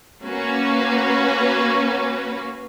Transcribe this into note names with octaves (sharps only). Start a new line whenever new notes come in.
A#3 C#4 F#4 B4